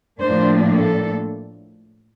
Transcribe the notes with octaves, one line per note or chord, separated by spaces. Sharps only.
A2 F3 A#3 D4 C5
A4